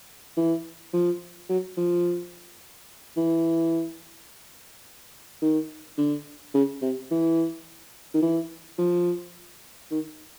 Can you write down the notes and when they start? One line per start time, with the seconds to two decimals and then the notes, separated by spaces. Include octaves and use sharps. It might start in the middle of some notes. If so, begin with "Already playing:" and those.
0.37 E3
0.94 F3
1.50 F#3
1.78 F3
3.17 E3
5.42 D#3
5.98 D3
6.54 C#3
6.82 C3
7.11 E3
8.14 D#3
8.22 E3
8.79 F3
9.91 D#3